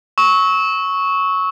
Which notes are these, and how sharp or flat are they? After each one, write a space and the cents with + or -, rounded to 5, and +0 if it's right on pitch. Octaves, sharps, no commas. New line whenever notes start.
C#6 +0 E6 -35